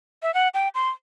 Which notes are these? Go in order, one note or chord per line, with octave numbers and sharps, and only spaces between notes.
E5
F#5
G5
C6